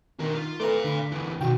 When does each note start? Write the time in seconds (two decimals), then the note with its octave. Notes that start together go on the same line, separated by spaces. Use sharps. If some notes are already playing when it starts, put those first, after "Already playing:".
0.20 D#3 D4 A#4
0.34 F4
0.60 A3 B4 D5 F5 A#5
0.84 D3 B5
1.12 C#2 E3
1.41 B2 D#3 F#4 G5